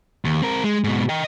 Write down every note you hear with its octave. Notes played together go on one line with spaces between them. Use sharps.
D#2
C4 A#4
G#3
G#2 B2
D#5 G5